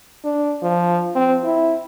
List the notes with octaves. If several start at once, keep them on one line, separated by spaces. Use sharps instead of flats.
D4
F3
C4
E4